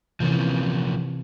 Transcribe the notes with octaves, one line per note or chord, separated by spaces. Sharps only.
C3 E3 F3 A#3 C#4